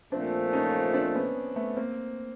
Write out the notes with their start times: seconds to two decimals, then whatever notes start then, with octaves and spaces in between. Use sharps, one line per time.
0.12 A#2 F3 A3 C4 D4
0.53 C#4 D#4
0.94 C4 D4
1.15 B3 C#4
1.56 A3 B3
1.77 A#3 C4